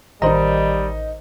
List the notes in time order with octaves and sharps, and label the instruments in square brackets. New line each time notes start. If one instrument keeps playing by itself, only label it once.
[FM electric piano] A1 D#3 [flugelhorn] G3 [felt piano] D#4 D#5 [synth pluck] A#4 C5 A#5